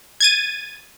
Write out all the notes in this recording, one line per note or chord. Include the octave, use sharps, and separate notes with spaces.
G#6 A6 D#7